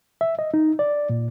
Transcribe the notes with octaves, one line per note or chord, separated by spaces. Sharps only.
E5
D#5
D#4
D5
A#2